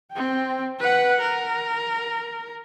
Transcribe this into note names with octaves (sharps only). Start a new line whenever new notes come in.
C4 G5
B4 F#5
A#4